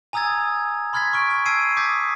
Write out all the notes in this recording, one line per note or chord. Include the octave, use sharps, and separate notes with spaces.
G#5 A#5 D#6 E6 G#6 A6
B5 C6 F6 G#6 A6 B6
C#6 F6 D7
F6
A5 E6 G#6 C7 D7 D#7
D6 D#6 G6 A6 B6